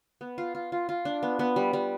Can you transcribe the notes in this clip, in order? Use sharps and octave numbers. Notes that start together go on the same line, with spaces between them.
B3
F4
F4
F4
F4
D4
B3
B3
G3
G3